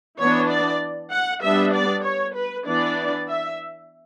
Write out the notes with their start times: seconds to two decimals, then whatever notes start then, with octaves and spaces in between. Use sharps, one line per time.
0.19 E3 B3 D4 C#5
0.49 D5
1.11 F#5
1.42 G3 B3 D4 E5
1.74 D5
2.04 C#5
2.35 B4
2.66 E3 B3 D4 D5
3.28 E5